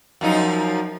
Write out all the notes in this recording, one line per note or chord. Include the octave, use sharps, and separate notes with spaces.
F#2 F3 D#4